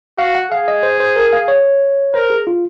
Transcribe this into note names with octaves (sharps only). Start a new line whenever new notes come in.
F#4 F5
F#5
G#4 F5
D#5
C5
C5
A#4
F5
C#5
A#4 C5
G#4
F4